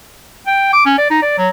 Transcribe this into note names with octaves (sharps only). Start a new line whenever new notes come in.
G5
D6
C#4
D5
D#4
D5
F#3